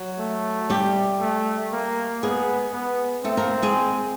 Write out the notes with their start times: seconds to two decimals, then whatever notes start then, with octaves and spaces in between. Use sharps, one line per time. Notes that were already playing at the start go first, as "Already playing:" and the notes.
Already playing: F#3 F#4
0.19 A3
0.70 G3 G4
1.20 A3
1.72 A#3
2.22 G#3 B3 G#4
2.73 B3
3.24 A3 C4 A4
3.37 A#3 A#4
3.62 G#3 G#4